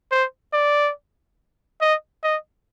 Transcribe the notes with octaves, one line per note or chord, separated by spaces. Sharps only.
C5
D5
D#5
D#5